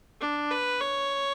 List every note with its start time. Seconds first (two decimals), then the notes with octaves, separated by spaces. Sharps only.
0.21 D4
0.51 B4
0.81 C#5